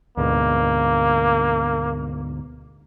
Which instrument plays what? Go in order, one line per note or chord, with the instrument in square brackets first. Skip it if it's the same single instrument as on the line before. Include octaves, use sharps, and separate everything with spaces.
[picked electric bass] D2 G#2 B2 [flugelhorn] A#3